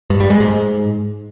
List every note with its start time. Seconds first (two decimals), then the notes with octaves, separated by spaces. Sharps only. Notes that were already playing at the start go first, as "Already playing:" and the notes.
0.10 G2
0.20 G3
0.30 G#3
0.40 G#2